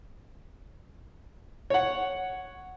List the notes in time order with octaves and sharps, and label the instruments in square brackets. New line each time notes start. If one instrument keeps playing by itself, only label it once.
[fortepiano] C#5 F#5